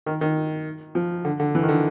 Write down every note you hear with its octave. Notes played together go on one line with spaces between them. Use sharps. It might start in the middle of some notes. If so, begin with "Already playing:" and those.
D#3
D#3
F3
D3
D3
E3
D#3
D3